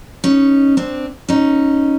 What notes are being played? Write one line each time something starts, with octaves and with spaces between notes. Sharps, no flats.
C#4 D#4
C4 D4
C#4 D#4